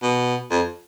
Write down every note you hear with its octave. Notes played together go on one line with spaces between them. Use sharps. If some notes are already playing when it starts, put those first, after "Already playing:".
B2
F2